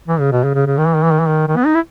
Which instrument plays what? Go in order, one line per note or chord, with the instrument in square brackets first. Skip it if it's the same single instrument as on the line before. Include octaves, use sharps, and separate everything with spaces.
[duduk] E3
C#3
B2
C#3
C#3
C#3
D#3
E3
D#3
E3
D#3
E3
D#3
D#3
B3
D#4
E4